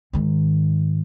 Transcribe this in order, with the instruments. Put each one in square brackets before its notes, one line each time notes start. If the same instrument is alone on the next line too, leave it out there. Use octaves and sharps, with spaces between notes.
[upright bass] G#2 D#3